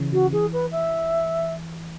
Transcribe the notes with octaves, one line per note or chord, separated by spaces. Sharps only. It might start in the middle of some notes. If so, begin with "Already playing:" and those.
Already playing: C#3 E3 C#4
C#3 F#4
E3 G#4
B4
E5